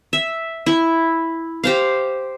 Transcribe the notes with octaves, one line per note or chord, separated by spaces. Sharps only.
E5
E4
G4 C5 F5